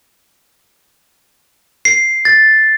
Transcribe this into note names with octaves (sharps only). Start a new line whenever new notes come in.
C7
A6